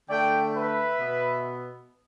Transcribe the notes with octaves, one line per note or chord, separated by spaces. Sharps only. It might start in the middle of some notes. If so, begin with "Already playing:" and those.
D3 A3 D5 G5
B4 E5
B2 B3